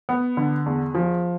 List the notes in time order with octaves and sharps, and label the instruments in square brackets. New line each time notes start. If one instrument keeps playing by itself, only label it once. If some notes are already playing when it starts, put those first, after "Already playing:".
[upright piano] B3
D3
E2
F3